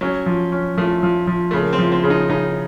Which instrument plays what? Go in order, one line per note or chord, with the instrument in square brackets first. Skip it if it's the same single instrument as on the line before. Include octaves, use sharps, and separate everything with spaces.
[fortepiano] F#3 [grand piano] C#4
[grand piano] F3
C#4
[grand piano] F3 [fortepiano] A3
[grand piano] F3
F3
[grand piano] C#3 [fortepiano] A3
[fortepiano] A#3
C4
[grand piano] F3
[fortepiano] C4
[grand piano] C#3
[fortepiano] D#4
[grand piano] C#3 [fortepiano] D#4